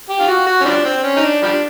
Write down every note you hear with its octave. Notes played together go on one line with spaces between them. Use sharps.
G4
F4
F#4
F#4
C#4
F3 G3 D4
C4
C#4
D#4
D4
F3 G3 D4